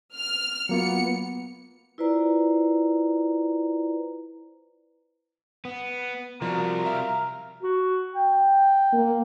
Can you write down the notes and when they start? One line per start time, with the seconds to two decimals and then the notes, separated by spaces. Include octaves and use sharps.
0.14 F6
0.69 F#3 A#3 B3 F4 C#7
1.98 E4 F4 B4 C5 D5 A#5
5.65 B3
6.42 C3 F3 G3 F#4 A#4
6.85 E5 F5
7.63 F#4
8.15 G5
8.93 A#3